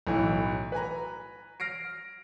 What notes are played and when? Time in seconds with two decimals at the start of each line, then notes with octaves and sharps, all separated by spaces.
0.07 B1 A2 E3 F#3
0.72 B4 G#5 A#5
1.60 F6 A#6 C7 D7